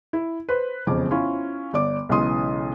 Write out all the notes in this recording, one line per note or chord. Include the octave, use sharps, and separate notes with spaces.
E4
B4 C5
E1 F2 C#3 D6
C#4 E4 F4
G1 D5 D6
B1 C#3 E3 G#3 C6 D#6